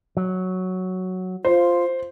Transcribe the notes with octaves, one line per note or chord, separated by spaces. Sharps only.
F#3
F4 C5